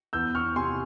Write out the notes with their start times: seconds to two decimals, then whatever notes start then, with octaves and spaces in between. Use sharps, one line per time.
0.13 E2 E6 G6
0.35 E2 C#6 F6
0.56 C3 G#5 C6